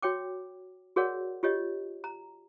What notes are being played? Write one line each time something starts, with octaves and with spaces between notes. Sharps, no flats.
F#4 C#5 G5 D6
F#4 G#4 A#4 C#5 D5 F#5
F4 G4 C#5 D#5
A#5